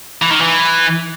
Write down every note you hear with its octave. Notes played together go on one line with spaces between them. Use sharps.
E3
D#3
E3